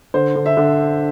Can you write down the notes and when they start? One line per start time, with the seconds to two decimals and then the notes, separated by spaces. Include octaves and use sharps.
0.14 D3 C5
0.35 D3
0.46 E5
0.57 D3